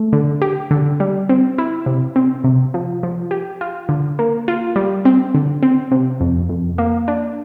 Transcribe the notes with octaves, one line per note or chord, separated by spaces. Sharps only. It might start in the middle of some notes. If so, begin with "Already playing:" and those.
Already playing: A3
D3
G4
D3
G3
C4
E4
C3
C4
C3
F3
F3
G4
F4
D3
A#3
F4
G3
C4
D3
C4
C3
F2
F2
A#3
D4